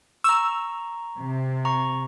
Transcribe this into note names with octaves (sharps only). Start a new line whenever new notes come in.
A#5 C#6 E6
C3
A#5 C#6